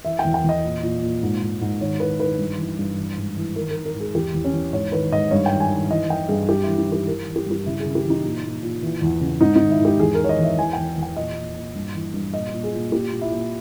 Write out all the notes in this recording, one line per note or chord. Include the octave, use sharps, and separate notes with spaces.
E3 E5
G5
E2
G5
E2 D#5
A#2
A#2
A#2
G#2
G#2
G#2
D#3 C#5
D#3 B4
D#3 B4
G2
E3
G2
E3
G#2
E3
D#3 A#4
A#4
D#3
A#4
G#2
G#4
E2 G4
E2
C#4
E2
G#2 C#5
D#3 B4
G#2 D#5
G2 C#5
G5
D#3
G#5
D#3
E3 D#5
E3 G5
G2 G#4
G2 G4
E3 E4
D#4
E3 G4
E3 A#4
E3
G4
G2 G4
C#3 E4
G#4
C#3
G4
E3
D#4
A#2
A#2
A#2
E3
E2
C#3
G#2 D#4
D#4
D#3
E4
G#2 G4
E2 G#4
D#3 A#4
C#5
D#5
E2 E5
E3 G#5
E2 G5
E2
G5
A#2 D#5
A#2
A#2
G2
E3
G2
A#2 D#5
A#2
G#4
A#2
A#2 G4
A#2
E4
A#2